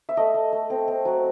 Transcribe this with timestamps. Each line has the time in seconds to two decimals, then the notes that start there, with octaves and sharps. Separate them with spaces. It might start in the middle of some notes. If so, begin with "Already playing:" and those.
0.09 E5
0.17 A3 D#5
0.34 A3
0.53 A3
0.70 C4
0.88 C4
1.05 F#3